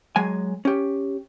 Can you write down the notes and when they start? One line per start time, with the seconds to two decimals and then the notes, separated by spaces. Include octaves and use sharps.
0.16 F#3 G#3 G#5
0.65 C#4 G4